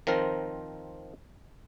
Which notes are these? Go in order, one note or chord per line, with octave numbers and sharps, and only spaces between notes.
D#3 F3 C4 A#4